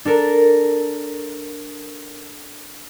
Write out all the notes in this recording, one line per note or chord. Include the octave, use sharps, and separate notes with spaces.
D4 A4 A#4